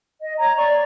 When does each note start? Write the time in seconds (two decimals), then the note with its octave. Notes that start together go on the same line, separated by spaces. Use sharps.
0.21 D#5
0.38 C#5 A#5
0.56 D5 C#6